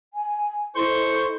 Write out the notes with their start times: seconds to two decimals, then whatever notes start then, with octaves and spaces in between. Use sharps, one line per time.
0.14 G#5
0.75 E4 A4 C5 D#5 C#6 G6